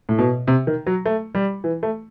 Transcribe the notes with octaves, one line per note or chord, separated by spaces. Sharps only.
A2
B2
C3
D#3
F#3
A3
G3
E3
A3